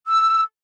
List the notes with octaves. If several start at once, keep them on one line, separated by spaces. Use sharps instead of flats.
E6